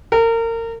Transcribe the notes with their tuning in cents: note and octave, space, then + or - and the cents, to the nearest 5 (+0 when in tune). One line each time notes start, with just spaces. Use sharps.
A#4 -30